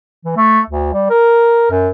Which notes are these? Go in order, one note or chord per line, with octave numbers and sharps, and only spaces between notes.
E3
A3
D2
G3
A#4
F#2